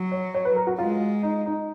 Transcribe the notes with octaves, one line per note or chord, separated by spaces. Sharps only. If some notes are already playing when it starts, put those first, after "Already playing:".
Already playing: F#3
C#5
C#5
B4
A#4
F#4
G#3 F4
D#4
D#4